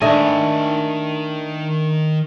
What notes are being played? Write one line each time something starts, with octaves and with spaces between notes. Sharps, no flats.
D#3 A3 D4 D#5 G#5